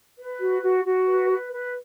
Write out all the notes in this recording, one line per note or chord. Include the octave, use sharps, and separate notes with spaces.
B4
F#4
F#4
F#4
B4
B4
B4